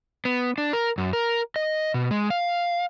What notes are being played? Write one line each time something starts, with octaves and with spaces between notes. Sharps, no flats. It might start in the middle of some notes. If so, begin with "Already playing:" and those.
B3
D4
A#4
F#2
A#4
D#5
B2
G#3
F5